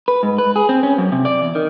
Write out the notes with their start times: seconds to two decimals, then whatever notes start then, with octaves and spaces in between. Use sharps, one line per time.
0.08 B4
0.23 G#2
0.38 B4
0.56 G#4
0.69 C4
0.83 C#4
0.98 F#2
1.12 C3
1.25 D5
1.42 E2
1.55 D#3